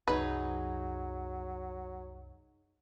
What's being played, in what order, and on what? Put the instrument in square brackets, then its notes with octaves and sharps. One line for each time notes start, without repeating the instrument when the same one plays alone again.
[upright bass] C2 F#2 [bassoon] F#3 [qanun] D#4 G#4 [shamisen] B4